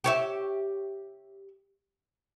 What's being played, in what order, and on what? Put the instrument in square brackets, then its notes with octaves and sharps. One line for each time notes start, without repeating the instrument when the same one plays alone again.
[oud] G4 C#5 E5